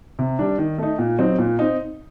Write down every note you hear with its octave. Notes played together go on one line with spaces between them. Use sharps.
C3
G3 D4
D#3
A3 D#4
A#2
F#3 C4 D#4
A#2
C4 D#4